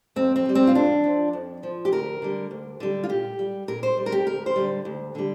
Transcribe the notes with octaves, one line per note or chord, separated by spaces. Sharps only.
F2 C4
C4
C3 G3
C4
F4
F2 D4
F3
F2
F3
G4
D2 A#4
D3 G3
D2
D3 G3
F4
A#2 G4
G3
A#2 A#4
C5
G3
A#4
G4
D2 A#4
C5
D3 G3
D2
D3 G3